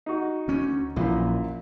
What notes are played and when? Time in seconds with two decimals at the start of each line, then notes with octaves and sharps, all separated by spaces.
0.06 D#4 F#4
0.48 D2 C#4
0.96 A#1 F#2 A#2 E3